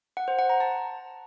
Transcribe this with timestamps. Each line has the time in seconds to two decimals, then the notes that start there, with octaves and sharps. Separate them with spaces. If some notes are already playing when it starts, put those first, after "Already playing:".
0.17 F#5
0.28 C5
0.39 F#5
0.49 A#5
0.60 A5